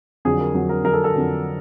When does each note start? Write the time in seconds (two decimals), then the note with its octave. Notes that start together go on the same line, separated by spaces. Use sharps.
0.25 F2 D3 F#3 G#4
0.40 A#4
0.54 F2 D3 F#3
0.69 A#4
0.84 F2 D3 F#3 A#4
0.93 A4
1.04 A4
1.14 F2 D3 F#3